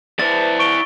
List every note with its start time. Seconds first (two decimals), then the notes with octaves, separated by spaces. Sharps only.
0.19 E4 B4 C5 D5 A5 A6
0.59 C#6 D7 G7